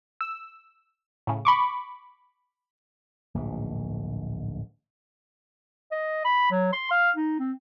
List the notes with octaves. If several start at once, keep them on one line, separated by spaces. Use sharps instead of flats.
E6
A2 C#3
B5 C#6 D6
D1 A#1 G#2
D#5
B5
F#3
C6
F5
D#4
C4